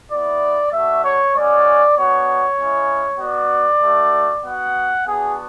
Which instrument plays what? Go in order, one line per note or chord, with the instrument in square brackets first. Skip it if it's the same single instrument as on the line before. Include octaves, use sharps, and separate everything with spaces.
[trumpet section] B3 E4 D5
A3 D4 F#4 E5
C#5
G#3 C#4 F#4 D5
B3 D4 F#4 C#5
G#3 C#4 E4
B3 F#4 D5
A3 D4 F#4
B3 F#4 F#5
B3 D4 F#4 G#4